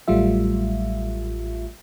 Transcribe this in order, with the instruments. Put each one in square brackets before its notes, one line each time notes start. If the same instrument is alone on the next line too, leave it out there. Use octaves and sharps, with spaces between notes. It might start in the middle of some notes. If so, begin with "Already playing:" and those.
[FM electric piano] A1 F#3 G3 A3 F4 E5